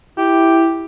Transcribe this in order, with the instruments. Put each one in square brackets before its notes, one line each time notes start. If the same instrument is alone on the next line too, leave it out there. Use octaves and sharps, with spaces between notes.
[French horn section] E4 [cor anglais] G4